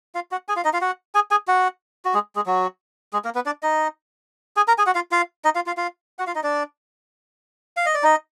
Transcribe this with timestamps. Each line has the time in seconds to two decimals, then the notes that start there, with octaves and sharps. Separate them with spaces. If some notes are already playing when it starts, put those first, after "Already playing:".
0.15 F4 F5
0.31 F#4 F#5
0.48 G#4 G#5
0.56 F4 F5
0.64 D#4 D#5
0.73 F4 F5
0.81 F#4 F#5
1.15 G#4 G#5
1.31 G#4 G#5
1.48 F#4 F#5
2.05 F#4
2.14 G#3 G#4
2.36 G#3 G#4
2.46 F#3 F#4
3.13 G#3 G#4
3.25 A#3 A#4
3.35 B3 B4
3.46 D4 D5
3.63 D#4 D#5
4.57 G#4 G#5
4.68 A#4 A#5
4.78 G#4 G#5
4.86 F#4 F#5
4.95 F4 F5
5.12 F4 F5
5.45 D#4 D#5
5.55 F4 F5
5.66 F4 F5
5.77 F4 F5
6.19 F#4 F#5
6.27 F4 F5
6.35 D#4 D#5
6.43 D4 D5
7.77 F5
7.86 D#5
7.95 D5
8.03 D#4 D#5